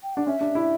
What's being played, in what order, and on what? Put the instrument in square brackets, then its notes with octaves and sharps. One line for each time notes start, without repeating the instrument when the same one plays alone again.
[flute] G5
[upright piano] D4 [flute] F#5
[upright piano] C#4 [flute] E5
[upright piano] D4
E4